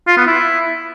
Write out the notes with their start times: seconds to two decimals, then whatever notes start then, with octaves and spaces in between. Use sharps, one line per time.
0.07 F4
0.17 B3
0.27 E4